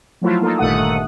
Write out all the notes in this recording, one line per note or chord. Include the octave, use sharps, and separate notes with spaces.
F3 F#3 A3 E4 F4
A#3 D#4 F4 A4
G1 A#2 D#3 A3 F#5 D#6